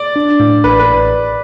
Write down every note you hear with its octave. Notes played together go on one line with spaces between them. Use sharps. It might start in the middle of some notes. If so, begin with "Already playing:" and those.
Already playing: D5
D4
A2
A1 B4
B4